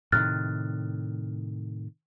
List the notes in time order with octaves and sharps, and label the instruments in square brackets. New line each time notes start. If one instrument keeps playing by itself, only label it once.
[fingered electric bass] A2 C3 D#3 [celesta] F6 F#6 A6